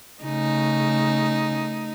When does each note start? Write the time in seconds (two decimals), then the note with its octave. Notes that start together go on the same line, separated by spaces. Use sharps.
0.24 C#3 A3 D#4